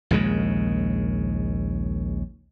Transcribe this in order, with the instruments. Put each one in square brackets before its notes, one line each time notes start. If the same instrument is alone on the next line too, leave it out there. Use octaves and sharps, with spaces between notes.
[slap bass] A#1 D#2 C#3 G#3